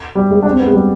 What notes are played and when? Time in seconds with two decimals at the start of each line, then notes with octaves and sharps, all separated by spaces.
0.15 G3
0.31 G#3
0.43 D4
0.50 C4
0.59 B3
0.66 G#3
0.74 G3